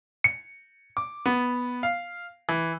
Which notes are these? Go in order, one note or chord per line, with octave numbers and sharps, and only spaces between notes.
C#7
D6
B3
F5
E3